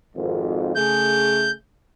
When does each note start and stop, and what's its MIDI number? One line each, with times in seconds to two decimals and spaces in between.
0.16 0.74 32
0.16 0.74 41
0.76 1.53 49
0.76 1.53 57
0.76 1.53 68
0.76 1.51 91